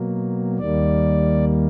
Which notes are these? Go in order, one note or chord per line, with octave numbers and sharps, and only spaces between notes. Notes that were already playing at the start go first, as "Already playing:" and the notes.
Already playing: B2 F#3 A#3
D#2 D#3 G3 A#3 D5